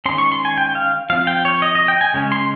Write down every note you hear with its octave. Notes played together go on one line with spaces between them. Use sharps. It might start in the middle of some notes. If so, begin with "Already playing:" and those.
D#3 G#3 C#4 C6
C#6
C6
G#5
G5
F5
F3 C4 F5
G5
C#5
D#5
D#5
G5
G#5
C#3 G#3 C#4
C6